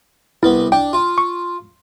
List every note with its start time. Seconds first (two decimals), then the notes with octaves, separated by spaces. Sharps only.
0.43 C2 B3 E4
0.72 D4 G5
0.93 F4
1.18 C#6